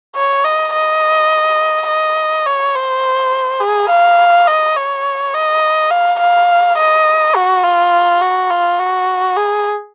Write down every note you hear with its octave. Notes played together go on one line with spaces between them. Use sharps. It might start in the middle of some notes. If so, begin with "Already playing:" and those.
C#5
D#5
D#5
D#5
C#5
C5
G#4
F5
D#5
C#5
D#5
F5
F5
D#5
F#4
F4
F#4
F4
F#4
G#4